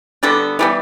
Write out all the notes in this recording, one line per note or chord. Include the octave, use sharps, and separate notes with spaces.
D3 G3 B3 D4 A4
E3 G3 B3